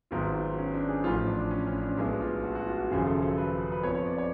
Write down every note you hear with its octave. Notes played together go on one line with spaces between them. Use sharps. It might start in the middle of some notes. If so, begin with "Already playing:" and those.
G#1 G#2 F#3 B3 F4
C#4
D4
G#4
A1 A2 F3 F4
D4
C#4
C#4
D4
B1 A2 G#3 B3 D4
F4
F#4
F#4
F4
F#4
G#1 F#2 C#3 F3 G#4
A4
A4
B4
B4
F2 F3 B3 C#5
C#5
D5
C#5